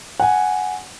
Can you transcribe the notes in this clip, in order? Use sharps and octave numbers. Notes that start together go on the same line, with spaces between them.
F#5 G#5